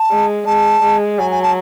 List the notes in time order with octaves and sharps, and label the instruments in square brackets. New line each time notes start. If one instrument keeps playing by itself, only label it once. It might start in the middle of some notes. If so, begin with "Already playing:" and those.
Already playing: [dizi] A5
[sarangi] G#3
[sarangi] G#3 [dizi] A5
[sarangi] G#3
[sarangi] F#3 [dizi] G#5
[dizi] G#5
A5